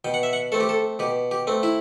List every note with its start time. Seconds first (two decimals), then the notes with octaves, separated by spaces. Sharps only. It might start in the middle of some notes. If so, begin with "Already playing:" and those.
0.04 B2 G5
0.14 F#5
0.23 E5
0.33 F#5
0.52 A3 C4 A4
0.60 G4
0.69 A4
0.99 B2 G4
1.31 G4
1.47 A3 C4
1.63 E4